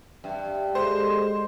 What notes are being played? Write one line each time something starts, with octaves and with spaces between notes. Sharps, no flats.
G2 E5 G5
G#3 A4 C5 D#5